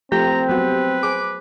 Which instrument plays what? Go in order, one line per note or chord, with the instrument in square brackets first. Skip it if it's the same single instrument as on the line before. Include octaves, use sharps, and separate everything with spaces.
[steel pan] F3 A3 F4 [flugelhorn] C4 [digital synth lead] G4 [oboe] A#5
[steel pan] F#3 B3 F#4 [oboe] B4
[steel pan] G#4 C5 [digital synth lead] D6